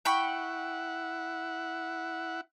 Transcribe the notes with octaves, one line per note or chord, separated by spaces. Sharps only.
E4 F#5 G5 B5 C#6